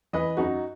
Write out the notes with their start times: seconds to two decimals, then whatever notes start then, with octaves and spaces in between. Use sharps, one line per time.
0.13 E3 B4 D#5
0.37 F#2 D#4 F#4